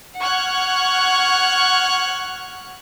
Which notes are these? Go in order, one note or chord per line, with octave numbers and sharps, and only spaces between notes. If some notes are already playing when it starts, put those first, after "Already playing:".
F#5 C#6 F6 F#6 G#6